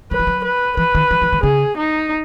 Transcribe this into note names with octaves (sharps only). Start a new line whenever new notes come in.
F#3 B4
E3
F#3
B4
E3 B4
D#3
E3
E3
D#3
C#3 G#4
D#4